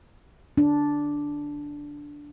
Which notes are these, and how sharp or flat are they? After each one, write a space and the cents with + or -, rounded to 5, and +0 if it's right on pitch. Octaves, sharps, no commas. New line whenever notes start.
D4 -5